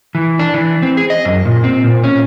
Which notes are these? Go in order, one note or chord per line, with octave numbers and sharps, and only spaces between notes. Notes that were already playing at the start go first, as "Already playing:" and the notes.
E3
D4
E3
C4
G#4
D#5
F#2
A#2
C4
A#2
C#4